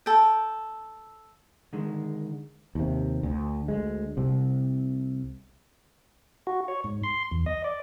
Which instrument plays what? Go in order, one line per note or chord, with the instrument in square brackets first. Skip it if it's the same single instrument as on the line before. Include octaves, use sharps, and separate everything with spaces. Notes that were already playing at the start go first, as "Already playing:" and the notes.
[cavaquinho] A4 G5
[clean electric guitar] D3 D#3 G#3
[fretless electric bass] D#2 C3
D2
D2 G#3
C2 C3
[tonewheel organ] F#4
C#5
G#2
C6
E2
D#5
D5